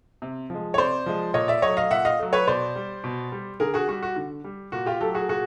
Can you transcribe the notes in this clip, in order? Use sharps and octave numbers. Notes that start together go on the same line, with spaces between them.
C3
F3 G#3
C#5
C3 C5 D5
F3 G#3
A#2 C#5 D#5
D5 E5
F#3 A3 C#5 D#5
D#5 F5
A#2 E5 F#5
D#5 F5
F#3 A3
B4 C#5
B2 C5 D5
G3
B2
G3
D3 G#4 A#4
F#4 G#4
G3 F#4
F#4
D3
G3
A#2 F#4
F4 G4
F#3 A3 G4 A4
F#4 G#4
A#2 F#4 G#4